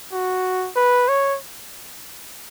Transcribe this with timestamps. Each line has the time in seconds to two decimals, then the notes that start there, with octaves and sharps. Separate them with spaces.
0.12 F#4
0.76 B4
1.08 C#5